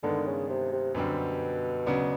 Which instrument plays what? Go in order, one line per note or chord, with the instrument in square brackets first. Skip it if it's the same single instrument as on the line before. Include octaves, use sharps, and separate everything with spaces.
[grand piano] G2 D#3 G#3 B3 [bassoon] D3
[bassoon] C#3
C3
C3
[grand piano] F#2 D3 G3 C4 [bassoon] B2
[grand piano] C#3 F#3 B3 D4